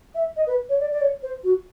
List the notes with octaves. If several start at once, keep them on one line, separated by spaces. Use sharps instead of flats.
E5
D#5
B4
C#5
D5
D5
C#5
C5
F#4